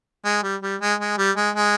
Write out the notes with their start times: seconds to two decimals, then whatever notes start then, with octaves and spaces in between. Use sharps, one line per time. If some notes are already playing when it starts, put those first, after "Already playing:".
0.25 G#3
0.43 G3
0.63 G3
0.81 G#3
1.00 G#3
1.18 G3
1.37 G#3
1.56 G#3